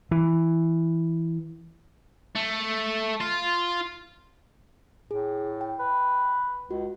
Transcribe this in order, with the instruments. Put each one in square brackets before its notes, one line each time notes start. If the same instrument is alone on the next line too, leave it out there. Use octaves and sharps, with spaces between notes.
[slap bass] E3
[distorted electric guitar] A3
F4
[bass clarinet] A2 [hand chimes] G#4
[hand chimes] G5
[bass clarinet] B4
[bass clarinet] C#2 [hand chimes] F#4